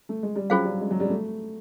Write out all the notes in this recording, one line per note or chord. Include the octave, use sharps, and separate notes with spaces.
A3
G#3
G3
F#3 C#4 F4 G#4 C5 F5
G3
G#3
F#3
G3
A3